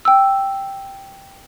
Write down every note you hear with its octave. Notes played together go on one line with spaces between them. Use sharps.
G5 E6